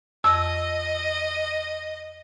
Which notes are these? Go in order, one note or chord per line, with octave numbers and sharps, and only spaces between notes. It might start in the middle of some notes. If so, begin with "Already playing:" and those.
F2 D#5 E6